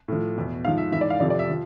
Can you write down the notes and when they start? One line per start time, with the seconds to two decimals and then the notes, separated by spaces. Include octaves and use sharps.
0.08 A2 F3
0.36 E2 B2
0.65 G#2 F3 F5
0.78 E5
0.92 G#2 E3 E5
1.01 D5
1.10 F5
1.20 F2 C3 F3 D5
1.30 D5
1.39 E5
1.50 F3